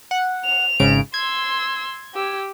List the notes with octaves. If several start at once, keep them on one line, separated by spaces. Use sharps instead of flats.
F#5
F7
G#1 C#3 D7
C6 E6 G#6
G4 E6